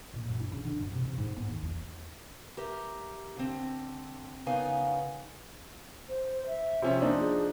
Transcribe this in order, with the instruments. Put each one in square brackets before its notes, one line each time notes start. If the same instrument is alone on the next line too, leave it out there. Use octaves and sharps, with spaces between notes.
[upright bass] A#2
F#2
E4
C#3
D3
F#2
C3
C3
G#2
B3
D#2
E2
[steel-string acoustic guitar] G4 A#4 E5
D3 C4
C#3 B3 D#4 A#4 F5 G#5
[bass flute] C5
E5
[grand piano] C3 F3 C#4
[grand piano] F3 D4 D#4 [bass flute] A#3
[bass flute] G#4